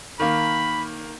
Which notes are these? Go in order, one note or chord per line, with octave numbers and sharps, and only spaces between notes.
D#3 A#3 B5